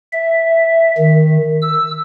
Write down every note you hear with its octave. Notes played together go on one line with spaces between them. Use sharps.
E5
D#3
E6